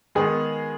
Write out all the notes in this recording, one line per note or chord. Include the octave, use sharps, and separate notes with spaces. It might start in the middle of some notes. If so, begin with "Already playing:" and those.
D#3 G#3 B3 G#4